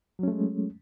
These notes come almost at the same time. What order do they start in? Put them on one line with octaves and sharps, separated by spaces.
F#3 C#4 A3 G#3